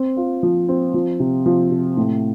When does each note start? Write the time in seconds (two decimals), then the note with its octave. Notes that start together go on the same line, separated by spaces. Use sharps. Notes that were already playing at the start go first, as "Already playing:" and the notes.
Already playing: C4
0.17 F4
0.43 F3
0.68 C4
0.94 F3
1.20 C3
1.46 F3
1.71 C3
1.97 A2